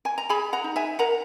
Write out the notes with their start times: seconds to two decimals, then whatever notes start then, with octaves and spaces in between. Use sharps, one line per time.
0.05 G#5
0.18 A#5
0.29 G#4 G#5 B5
0.53 F#5 A#5
0.64 D#4
0.76 E5 G#5
0.99 A#4 F#5 A#5